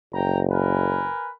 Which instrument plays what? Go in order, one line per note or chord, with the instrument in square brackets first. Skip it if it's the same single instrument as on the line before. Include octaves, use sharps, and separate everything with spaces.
[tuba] F#1 [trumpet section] G5 A#5
[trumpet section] A#4 B4 G#5